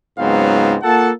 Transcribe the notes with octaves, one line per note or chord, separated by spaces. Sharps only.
C#2 G#2 F#3 B3 C4 F5
A#3 F4 A4 F#5 A5